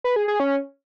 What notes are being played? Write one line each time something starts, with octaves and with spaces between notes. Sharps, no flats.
B4
G#4
G#4
C#4